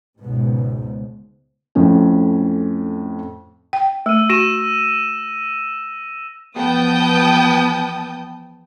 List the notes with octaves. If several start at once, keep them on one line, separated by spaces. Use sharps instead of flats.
C#2 G#2 B2
F2 A2 C#4
G5
A3 E6 D#7
F#4 A#6 D#7 E7
E2 F3 B3 G5 A5 D#6